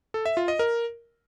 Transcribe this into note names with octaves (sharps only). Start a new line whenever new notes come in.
A4
E5
F4
D#5
A#4